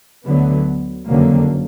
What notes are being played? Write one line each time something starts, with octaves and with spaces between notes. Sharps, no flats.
D2 D3 F#3 B3
F#1 F2 D3 F#3 A#3